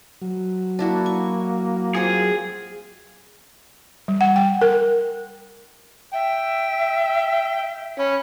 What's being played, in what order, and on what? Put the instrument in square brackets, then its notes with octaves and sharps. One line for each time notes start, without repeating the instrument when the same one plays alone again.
[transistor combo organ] F#3
[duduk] A#3 [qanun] D4 E4 F#4
[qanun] C#6
[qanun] C4 F4 [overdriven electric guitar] G#4
[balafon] G3
F#5
G5
A#4
[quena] E5 [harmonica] G5
[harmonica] C#4 [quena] B5